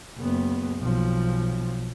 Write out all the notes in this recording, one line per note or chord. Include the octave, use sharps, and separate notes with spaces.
F#1 B3
B1 F3